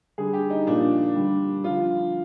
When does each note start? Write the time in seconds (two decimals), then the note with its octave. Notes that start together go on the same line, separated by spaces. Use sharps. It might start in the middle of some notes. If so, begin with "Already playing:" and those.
0.18 D3 G3 G#4
0.33 G4
0.50 D#4
0.67 A#2 F3 D4
1.16 D3 G3
1.64 D3 F3 F4